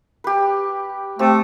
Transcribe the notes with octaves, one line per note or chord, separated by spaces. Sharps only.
G4 B4
A3 C4 G4